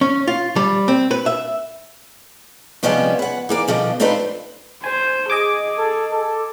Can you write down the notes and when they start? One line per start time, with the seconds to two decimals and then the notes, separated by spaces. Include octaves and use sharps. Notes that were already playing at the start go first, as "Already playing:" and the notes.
0.01 C#4
0.27 F4
0.56 G3
0.88 C4
1.11 B4
1.26 E5
2.83 C3 F3 G3 G#3 B3 C#4
3.19 B4 F#5
3.49 E3 A#3 D5
3.68 B2 D3 F3 G3
4.00 C4 D4 D#4 F4 A4 B4
4.84 C5 G#5
5.30 G#4 D#5 G#5 D6
5.78 A4
6.12 A4